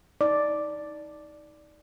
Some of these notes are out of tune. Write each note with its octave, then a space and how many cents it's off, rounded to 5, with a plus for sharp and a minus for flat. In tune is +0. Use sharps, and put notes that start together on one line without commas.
D#4 +20 D5 +0